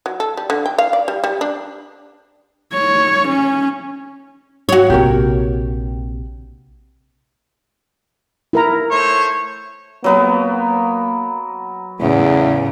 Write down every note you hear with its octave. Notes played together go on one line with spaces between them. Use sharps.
F#3
A4
G3
D3
G5
F5
D5
G3
G3
D4
C#5
C#4
F#4 C#5
A#1 C3 G4 A#4
E4 A#4 A#5
A3 C5 C#5
F#3 A#3 B3 A#4
E2 A2 C#3